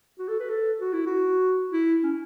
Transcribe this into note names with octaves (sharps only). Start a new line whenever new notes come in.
F#4
A4
B4
A4
F#4
E4
F#4
E4
C#4